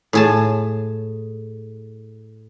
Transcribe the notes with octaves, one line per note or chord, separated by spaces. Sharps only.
A2 G#4 A5